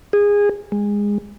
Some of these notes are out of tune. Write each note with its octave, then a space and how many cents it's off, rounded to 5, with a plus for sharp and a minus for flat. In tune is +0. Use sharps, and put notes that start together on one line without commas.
G#4 -20
G#3 -20